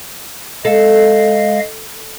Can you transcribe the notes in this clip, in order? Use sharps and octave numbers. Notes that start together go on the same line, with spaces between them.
G#3 A4 D#5 F5